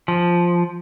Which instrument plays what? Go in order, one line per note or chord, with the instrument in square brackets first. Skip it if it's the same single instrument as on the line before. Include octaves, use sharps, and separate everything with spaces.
[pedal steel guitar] F3